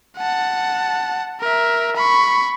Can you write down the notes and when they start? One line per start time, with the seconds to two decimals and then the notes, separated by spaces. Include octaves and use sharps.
0.18 F#5 A5
1.40 A#4 E5
1.96 B5 C#6